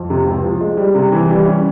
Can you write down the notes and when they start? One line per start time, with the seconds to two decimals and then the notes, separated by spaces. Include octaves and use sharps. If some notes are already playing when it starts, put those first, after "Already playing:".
Already playing: F2
0.10 C3
0.27 C#2
0.44 F3
0.61 G#3
0.77 G3
0.95 C3
1.12 E3
1.29 G3
1.46 C#4